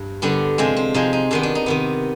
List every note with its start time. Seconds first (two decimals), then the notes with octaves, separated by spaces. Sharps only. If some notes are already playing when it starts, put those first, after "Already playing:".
Already playing: G2
0.22 D3 G3 B3 D4
0.58 C3 F3 G#3 C4
0.77 C4
0.94 C3 F3 G#3 D#4
1.13 D#4
1.31 C3 D#3 B3 D4
1.43 D4
1.55 D#4
1.66 C3 D#3 B3